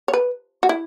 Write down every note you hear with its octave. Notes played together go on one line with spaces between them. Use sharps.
C#5
B4
F#4
E4